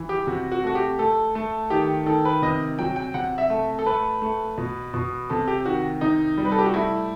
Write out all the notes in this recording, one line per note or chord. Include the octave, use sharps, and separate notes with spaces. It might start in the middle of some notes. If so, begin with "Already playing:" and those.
Already playing: E3
G4
C3 F#4
F#4
A3 F#4
G4
A3 A4
A3
D#3 G4
D#3 A4
B4
C3 D#5
F#3 G5
G5
C3 F#5
E5
A3
A4
A3 B4
A3
B2
B2
C3 A4
G4
D#3 F#4
C3 D#4
G3
B4
A4
G4
F#4
A3 E4